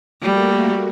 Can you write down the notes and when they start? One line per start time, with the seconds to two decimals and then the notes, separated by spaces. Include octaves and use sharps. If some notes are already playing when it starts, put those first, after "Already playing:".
0.22 G3 A3 A#3 F#4